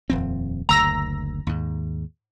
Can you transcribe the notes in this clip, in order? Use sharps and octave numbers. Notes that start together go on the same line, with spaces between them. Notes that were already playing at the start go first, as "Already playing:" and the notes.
D#1 F2 C4
F#1 D2 A#5 E6 A#6
D#2 G#2